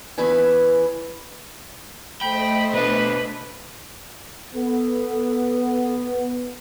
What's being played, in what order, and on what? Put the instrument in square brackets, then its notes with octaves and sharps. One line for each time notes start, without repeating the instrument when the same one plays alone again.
[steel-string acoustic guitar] E2 C#3 E3 E4 B4 G#5
[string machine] A3 C5 D#5 [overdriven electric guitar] G5 [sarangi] B5
[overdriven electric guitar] B2 D4 [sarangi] B4
[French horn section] B3 [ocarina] A4